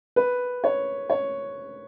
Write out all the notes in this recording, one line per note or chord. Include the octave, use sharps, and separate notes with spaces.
B4
C#5
C#5